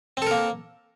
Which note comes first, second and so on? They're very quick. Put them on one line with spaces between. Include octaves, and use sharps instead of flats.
C4 A4 A#4 A#3